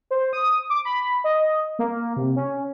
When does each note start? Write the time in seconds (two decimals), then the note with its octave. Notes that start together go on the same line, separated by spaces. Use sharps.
0.11 C5
0.33 D#6
0.70 D6
0.85 B5
1.24 D#5
1.79 A#3
2.17 C3
2.36 C#4